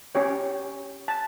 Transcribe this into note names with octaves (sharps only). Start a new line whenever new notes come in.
C#4 G4 C#5 G5
A5